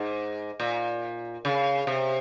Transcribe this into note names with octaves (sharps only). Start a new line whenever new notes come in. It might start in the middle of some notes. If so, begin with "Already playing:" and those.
Already playing: G#2
A#2
C#3
C3